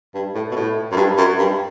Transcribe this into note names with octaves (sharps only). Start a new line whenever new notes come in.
G2
A2
B2
A2
F#2
G2
F#2
G2